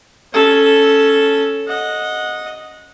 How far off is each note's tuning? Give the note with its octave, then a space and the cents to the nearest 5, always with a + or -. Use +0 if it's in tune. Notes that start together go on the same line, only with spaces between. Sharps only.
C#4 +0 A4 -5
D#5 +0 F#5 -20